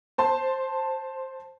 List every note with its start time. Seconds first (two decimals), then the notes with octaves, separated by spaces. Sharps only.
0.18 C5 A5 C6